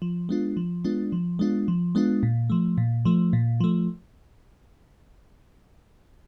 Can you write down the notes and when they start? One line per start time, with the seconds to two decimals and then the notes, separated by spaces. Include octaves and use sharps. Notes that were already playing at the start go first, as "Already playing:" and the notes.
0.02 F3
0.29 G#3 B3 D4 F4
0.57 F3
0.85 G#3 B3 D4 F4
1.12 F3
1.39 G#3 B3 D4 F4
1.68 F3
1.95 G#3 B3 D4 F4
2.23 A#2
2.50 F3 A3
2.78 A#2
3.05 F3 A3
3.33 A#2
3.61 F3 A3